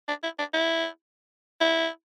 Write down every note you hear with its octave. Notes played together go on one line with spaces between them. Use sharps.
D4
E4
D4
E4
E4